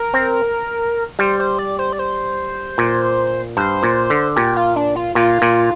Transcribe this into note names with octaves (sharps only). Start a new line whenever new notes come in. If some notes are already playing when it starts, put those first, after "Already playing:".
Already playing: A#4
C4
G3 C5
C5
D5
C5
D5
C5
A#2
G2 C5
A#2
D3
A#2 G4
F4
D4
F4
A#2 F4
A#2